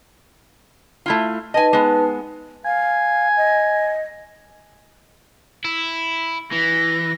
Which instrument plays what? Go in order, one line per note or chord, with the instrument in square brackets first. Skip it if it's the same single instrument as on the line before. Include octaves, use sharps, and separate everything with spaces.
[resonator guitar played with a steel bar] A3 E4 F4
[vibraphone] D#4 B4 A5 [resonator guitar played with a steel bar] D#5 G#5
[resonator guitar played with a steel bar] G#3 B3
[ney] F5 [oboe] G#5
[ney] D#5
[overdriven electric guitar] E4
[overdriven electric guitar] E3 [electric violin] A#6